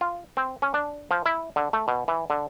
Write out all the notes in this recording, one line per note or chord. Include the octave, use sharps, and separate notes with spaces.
F4
C4
C#4
D4
F3
E4
D3
A3
B2
E3
D3